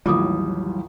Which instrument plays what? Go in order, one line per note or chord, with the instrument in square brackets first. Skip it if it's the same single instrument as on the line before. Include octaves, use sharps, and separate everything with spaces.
[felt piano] A1 D#2 E3 [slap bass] F#3 G3 [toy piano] F4 D6 D#6